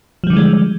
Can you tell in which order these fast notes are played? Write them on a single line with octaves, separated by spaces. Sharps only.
F3 G3 D3 E3 G#3